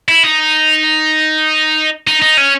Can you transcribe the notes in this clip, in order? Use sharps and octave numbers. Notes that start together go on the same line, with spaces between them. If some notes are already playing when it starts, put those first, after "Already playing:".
E4
D#4
D#4
D#4
C#4